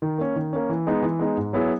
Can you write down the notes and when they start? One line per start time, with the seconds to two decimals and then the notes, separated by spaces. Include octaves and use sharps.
0.02 D#3
0.18 A#3 C#4
0.36 D#3
0.53 A#3 C#4
0.69 E3
0.87 G#3 B3 D#4
1.03 E3
1.19 G#3 B3 D#4
1.37 G#2
1.53 F#3 B3 E4 G#4